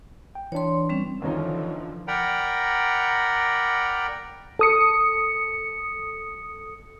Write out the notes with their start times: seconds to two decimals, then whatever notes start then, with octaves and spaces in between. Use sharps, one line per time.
0.35 G5
0.52 E3 D4 C#5 C6
0.89 G3 C4 C#4
1.22 D#2 D3 E3 F3 C#4 D#4
2.08 A#4 D5 F#5 G5 A#5 B5
4.59 A4 D#6 C#7